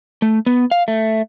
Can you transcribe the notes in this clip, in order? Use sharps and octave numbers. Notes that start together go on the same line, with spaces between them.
A3
B3
F5
A3